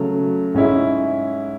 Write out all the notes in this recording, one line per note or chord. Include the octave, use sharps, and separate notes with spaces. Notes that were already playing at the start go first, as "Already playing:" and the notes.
Already playing: C#3 F#3 A3
G#2 G#3 C#4 E4